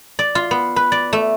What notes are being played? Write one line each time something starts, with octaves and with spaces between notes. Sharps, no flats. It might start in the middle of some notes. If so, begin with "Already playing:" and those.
D5
F4
B3
B4
D5
A3